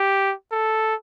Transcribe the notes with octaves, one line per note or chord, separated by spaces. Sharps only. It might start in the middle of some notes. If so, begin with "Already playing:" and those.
Already playing: G4
A4